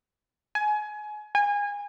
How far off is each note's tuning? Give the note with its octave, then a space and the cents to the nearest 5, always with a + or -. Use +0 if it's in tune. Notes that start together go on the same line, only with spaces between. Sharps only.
G#5 +25
G#5 -25